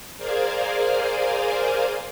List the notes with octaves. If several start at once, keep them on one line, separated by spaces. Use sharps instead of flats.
G#4 A#4 C5 D5 F5 G#5